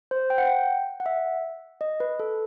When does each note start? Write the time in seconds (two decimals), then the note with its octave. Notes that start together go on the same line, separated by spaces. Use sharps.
0.11 C5
0.30 G5
0.38 F#5
0.46 G5
1.00 F#5
1.06 E5
1.81 D#5
2.00 B4
2.20 A4